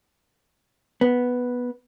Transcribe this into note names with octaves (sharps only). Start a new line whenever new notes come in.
B3